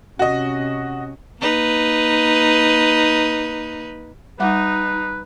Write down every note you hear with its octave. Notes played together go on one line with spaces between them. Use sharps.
C3 C#4 F#4 D#5
A#3 D#4 B4
G3 D#4 B4 F#5 D6